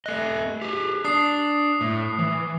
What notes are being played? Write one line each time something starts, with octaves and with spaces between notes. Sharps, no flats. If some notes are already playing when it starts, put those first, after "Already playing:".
A3 D#5 F#6
G4 G#4
D4 D#6 C7
A2
E3